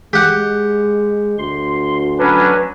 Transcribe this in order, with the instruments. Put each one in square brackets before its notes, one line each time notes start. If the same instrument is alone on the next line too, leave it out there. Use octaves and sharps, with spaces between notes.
[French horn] G#3 [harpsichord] G4 F#5
[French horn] D2 [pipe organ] C6
[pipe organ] F#3 C#4 D4 [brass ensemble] B4